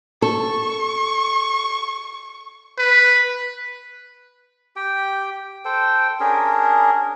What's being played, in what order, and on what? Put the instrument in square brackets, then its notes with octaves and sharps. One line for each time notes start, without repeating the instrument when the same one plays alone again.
[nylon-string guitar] A4 [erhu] C#6
[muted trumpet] B4
[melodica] G4 G5
A4 C5 G5
C#4 D4 G#4 A#4